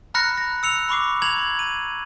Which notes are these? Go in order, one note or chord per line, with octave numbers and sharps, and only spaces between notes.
A#5 B5 F6 F#6 A#6 C#7
A#6
E6 C#7 F7
B5 C#6 D6 C7
A#5 G#6 F7 F#7
D#7